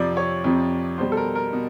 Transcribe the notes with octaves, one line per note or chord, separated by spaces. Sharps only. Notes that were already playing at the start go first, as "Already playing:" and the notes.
Already playing: F2 C3 F3 D5
C#5
F2 C3 F3
B2 G3 C5
A4
A#4
A#4
B2